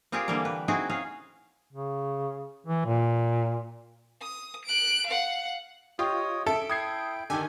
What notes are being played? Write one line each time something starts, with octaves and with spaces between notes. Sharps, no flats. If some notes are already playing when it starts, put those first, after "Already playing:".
C4 F4 G4 G#4 A#4 D5
D3 E3 G3 A#3 A#4 D5
B4
C4 D#4 E4 F#4 G#4
C#4 G#4 F5
C#3
E3
A#2
D#6
F#6 D7
F5 F#5
F4 G4 C#5 D#5 D#6
A4 E5 D7
E4 G5 D#6 G#6 C7
D3 D#3 G4 A4 G#5